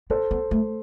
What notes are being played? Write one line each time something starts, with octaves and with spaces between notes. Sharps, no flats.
B3 A4 C5
B3
A3